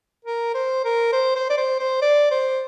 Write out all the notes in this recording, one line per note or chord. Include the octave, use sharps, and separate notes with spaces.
A#4
C5
A#4
C5
C5
D5
C5
C5
D5
C5